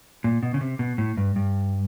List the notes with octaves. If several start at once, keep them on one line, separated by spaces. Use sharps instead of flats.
A#2
B2
C#3
C3
B2
A2
G2
G2